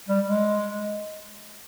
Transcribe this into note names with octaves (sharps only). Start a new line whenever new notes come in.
G3
G#3